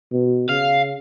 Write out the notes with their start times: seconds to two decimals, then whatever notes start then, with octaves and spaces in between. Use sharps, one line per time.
0.12 B2
0.49 C#3 F5